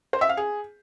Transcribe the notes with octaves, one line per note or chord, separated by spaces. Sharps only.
C5
E5
F5
G#4